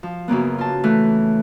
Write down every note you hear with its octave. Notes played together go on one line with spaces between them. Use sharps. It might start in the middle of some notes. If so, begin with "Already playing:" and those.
F3
F#2 C#3 A#3 B3
F4 A5
E3 A3